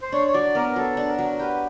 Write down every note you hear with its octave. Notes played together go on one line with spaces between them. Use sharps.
C5
D4 C#5
C#5
F#3 D5
B3 A#4
F#3 A4
D4
A#4
F#3
G4 B4